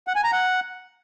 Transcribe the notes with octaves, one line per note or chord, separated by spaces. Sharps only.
F#5
G#5
A#5
F#5